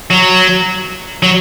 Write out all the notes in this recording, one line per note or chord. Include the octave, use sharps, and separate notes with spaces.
F#3
F#3